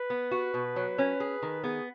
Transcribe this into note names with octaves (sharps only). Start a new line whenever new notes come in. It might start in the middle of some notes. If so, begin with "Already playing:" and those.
Already playing: B4
B3
F#4
B2
F#3
C#4
G#4
D#3
B3 G#4